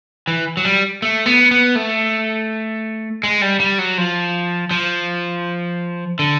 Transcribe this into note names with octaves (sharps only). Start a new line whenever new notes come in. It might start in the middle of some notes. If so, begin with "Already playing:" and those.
E3
F#3
G3
A3
B3
B3
A3
G#3
G3
G3
F#3
F3
F3
D3